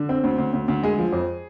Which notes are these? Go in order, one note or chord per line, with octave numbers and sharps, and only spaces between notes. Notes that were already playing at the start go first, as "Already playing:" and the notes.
Already playing: D3
C4
D2
D2
D2
D2
G#3 G#4
F3
F2